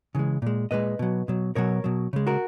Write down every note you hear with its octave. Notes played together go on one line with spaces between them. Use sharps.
C#3 E3 G#3
A#2 G#3
A#2 G#3 B4 D#5
B2 F#3
B2 F#3
B2 F#3 A#4 C#5
B2 F#3
C#3 G#3
F#4 A#4